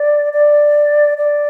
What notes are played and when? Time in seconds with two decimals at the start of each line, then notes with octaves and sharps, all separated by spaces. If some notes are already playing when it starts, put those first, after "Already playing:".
Already playing: D5
0.33 D5
1.18 D5